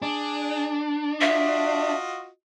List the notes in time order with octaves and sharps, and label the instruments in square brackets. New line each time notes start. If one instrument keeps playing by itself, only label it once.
[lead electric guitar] D4 [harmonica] G#4
[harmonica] F4 F#4 D#5 [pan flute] E5